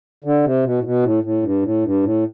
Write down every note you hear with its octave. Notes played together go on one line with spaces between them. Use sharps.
D3
C3
B2
A2
B2
A2
A2
G2
A2
G2
A2